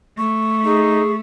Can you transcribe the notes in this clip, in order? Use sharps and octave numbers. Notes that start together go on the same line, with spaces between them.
A3 C#6
D#4 G#4